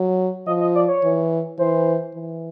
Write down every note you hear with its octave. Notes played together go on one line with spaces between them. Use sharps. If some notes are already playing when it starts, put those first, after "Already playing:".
Already playing: F#3
F3 D#5
D#5
D5
C#5
E3
E3 C5
E3